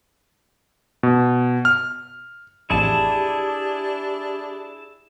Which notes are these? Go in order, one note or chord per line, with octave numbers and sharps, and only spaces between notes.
B2
F6
A1 F2 D4 E4 G4 G#4 A5